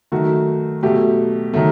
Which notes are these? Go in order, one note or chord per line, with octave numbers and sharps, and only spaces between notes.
D#3 F#3 A3 F#4
B2 F#3 A3 G4
D#3 F#3 A3